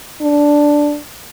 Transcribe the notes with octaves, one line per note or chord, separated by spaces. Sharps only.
D4